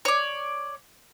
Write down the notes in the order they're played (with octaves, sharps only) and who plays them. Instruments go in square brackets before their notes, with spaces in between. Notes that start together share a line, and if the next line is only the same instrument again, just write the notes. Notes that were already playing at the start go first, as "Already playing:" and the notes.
[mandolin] C#5 D5